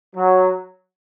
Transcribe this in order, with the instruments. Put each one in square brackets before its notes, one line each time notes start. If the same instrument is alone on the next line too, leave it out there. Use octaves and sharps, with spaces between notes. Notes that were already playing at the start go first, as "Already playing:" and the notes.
[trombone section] F#3